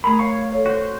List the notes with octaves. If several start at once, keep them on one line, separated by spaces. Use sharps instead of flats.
A3 G#4 A#4 A#5 B5
C#5 F5 C#6
A4 C#5
F#4 C5